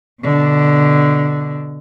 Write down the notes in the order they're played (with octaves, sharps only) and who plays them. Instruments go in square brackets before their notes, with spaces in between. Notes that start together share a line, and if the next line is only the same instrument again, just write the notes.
[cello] B2 D3